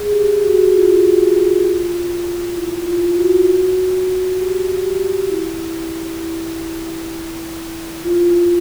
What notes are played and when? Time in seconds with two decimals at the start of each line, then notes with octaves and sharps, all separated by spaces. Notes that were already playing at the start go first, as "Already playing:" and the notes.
Already playing: G#4
0.12 G4
0.42 F#4
0.72 F4
2.55 E4
2.86 F4
3.16 F#4
4.38 G4
4.84 G4
5.30 E4
6.21 E4
8.03 F4